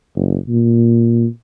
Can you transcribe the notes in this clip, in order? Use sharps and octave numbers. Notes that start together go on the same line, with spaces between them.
F#1
A#2